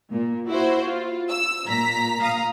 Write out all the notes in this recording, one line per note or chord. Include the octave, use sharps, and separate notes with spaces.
A#2
E4 F#4 C5
F4
E6
A#2 A#5 B6
F5 A#5 D#6